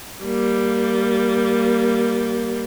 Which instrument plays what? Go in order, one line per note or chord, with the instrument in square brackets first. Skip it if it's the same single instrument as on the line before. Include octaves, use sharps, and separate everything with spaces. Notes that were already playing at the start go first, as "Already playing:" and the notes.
[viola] G3 A#3